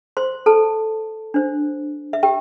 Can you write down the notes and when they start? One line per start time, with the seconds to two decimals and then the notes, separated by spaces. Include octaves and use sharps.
0.17 C5 C6
0.46 A4 A5
1.34 D4 C5
2.13 E5
2.23 G4 G5